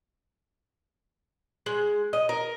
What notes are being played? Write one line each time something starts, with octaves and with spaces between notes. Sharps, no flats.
G#3
D#5
A#4